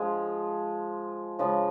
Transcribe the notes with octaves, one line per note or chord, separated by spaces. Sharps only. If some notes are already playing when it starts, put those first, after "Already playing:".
Already playing: F3 G#3 F4
C#3 F3 G#3 F4